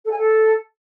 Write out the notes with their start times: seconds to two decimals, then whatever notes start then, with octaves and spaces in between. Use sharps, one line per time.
0.04 A4
0.11 G#5
0.17 A4